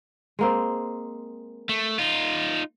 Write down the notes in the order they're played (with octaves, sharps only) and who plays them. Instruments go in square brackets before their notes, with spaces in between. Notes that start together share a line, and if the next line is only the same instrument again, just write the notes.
[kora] G#3 A#3 C4
[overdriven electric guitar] A3
D#4 F4